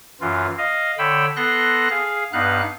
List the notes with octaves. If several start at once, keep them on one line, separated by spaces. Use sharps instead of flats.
F#2 E3 F4
D#5 F5
D3 C#5 G5 B5 E6
B3 A4 C6 F#6 A#6
G#4 F5
G2 B3 D#4 F5 F#6